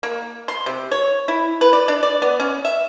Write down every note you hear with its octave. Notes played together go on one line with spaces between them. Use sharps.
A#3
C6
C3
C#5
E4
B4
D5
D4
D5
B3
C#4
E5